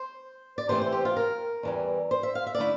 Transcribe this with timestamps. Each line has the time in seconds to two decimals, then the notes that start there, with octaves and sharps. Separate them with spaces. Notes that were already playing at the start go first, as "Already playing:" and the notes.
Already playing: C5
0.58 D5
0.69 C3 E3 A3 C4 C5
0.81 C5
0.92 G4
1.05 F4
1.16 A#4
1.63 E2 E3 G3
2.11 C5
2.23 E5
2.35 F5
2.47 E5
2.55 D5
2.58 D3 A3 E4